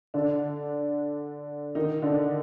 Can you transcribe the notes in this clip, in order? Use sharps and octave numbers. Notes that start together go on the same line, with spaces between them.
D3 D4
D#3 D#4
D3 D4